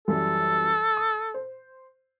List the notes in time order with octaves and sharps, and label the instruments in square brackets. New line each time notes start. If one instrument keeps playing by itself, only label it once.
[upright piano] F#2 E3 G3 [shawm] A4
[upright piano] D#6
C5